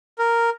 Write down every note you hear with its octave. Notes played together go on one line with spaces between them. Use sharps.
A#4